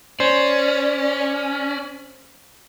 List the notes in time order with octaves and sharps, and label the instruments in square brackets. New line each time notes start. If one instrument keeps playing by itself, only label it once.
[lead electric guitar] C#4 [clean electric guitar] C5 [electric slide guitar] D5